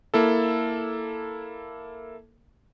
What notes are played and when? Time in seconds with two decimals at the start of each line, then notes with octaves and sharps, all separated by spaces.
0.14 A#3 E4 A4